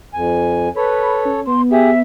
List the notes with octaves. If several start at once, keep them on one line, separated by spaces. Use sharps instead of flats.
F2 G#5
A4 B4 C#5 B5
C#4
B3 C6
G4 G#4 E5